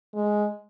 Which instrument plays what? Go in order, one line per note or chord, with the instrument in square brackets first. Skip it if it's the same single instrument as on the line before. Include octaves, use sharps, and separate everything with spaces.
[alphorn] G#3